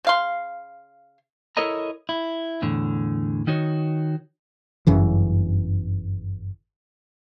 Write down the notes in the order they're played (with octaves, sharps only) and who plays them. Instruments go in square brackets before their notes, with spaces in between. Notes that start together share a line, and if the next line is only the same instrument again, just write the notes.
[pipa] C#3 F5 C6
[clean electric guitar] E4 A4 A#4 C#5 D#5 A#5
E4
E2 A2 D3
D#3 D#4 F#4 C#5
[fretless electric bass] G1 F#2 C#3 E3